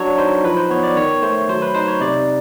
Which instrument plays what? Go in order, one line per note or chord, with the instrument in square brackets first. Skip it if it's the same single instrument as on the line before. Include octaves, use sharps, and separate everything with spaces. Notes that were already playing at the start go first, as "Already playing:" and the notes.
Already playing: [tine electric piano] F#3 D4 C#5
D#4 C5
F3 B4
C5
B3 C#5
D5
D#3 C#5
A3 C5
F#3 C5
B4
D#4 C5
C#5
C3 D5